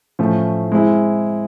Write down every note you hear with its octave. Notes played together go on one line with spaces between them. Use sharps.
A2 F3 A3 C#4
G#3 C4 E4